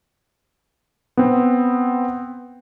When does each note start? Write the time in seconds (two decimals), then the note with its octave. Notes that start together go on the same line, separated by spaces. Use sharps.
1.17 B3 C4